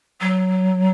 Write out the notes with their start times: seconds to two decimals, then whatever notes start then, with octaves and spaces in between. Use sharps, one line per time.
0.20 F#3